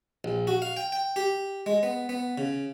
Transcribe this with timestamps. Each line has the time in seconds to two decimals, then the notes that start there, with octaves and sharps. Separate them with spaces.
0.24 A#1
0.47 F#4
0.62 F5
0.77 G5
0.92 G5
1.16 G4
1.66 G#3
1.83 B3
2.09 B3
2.38 C#3